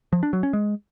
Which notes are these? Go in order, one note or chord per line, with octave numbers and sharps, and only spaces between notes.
F3
D4
F#3
C#4
G#3